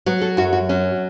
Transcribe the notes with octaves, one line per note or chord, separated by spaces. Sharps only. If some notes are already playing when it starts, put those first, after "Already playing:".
F#3 B3
A4
F#2 F#4
F#4
F#3 C#4